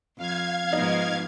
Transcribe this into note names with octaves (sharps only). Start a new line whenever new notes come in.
F2 F5 G#6
G#2 F3 B3 D#4